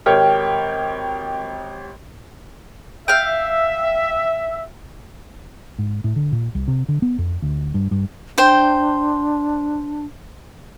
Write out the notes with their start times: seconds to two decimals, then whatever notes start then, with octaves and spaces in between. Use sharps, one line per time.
0.06 G#1 G4 A#4 C#5 G5 F6
3.08 E5 F5 G5
5.79 G#2
6.04 A2
6.16 D3
6.32 A#2
6.55 C2
6.68 C3
6.89 D3
7.02 B3
7.18 F2
7.42 D2
7.74 G2
7.91 G2
8.38 D4 C5 G5 C6